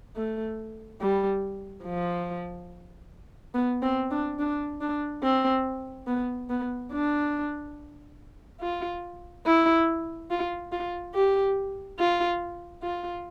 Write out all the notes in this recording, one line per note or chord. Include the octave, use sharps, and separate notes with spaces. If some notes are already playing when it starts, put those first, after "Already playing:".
A3
G3
F3
B3
C4
D4
D4
D4
C4
B3
B3
D4
F4
E4
F4
F4
G4
F4
F4